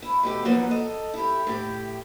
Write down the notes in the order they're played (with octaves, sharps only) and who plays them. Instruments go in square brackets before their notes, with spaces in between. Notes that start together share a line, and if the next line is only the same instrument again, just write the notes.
[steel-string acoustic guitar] E4
B2 A3 G4
F#2 F3 A#3 D#4 B4 F#5
A4 D#5
E4 G4
A2 G4